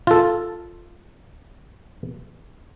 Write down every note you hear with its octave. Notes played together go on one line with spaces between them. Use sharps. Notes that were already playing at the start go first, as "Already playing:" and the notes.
F4 A4